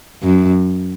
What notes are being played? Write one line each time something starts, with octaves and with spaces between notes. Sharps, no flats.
F#2